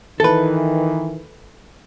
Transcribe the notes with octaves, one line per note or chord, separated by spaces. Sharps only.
D#3 E3 A4 B4